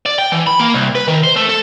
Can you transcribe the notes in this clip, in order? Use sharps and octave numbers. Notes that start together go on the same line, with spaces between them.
D5
G5
E3
B5
A#3
C2
B4
D#3
C5
A3
A4